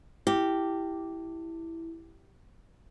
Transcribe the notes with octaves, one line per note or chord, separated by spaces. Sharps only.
E4 G4